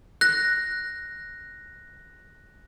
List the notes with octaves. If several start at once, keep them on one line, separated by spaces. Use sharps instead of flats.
F#6 A#6